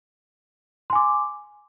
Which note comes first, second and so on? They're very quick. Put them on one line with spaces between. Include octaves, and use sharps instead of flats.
C6 G#5 D6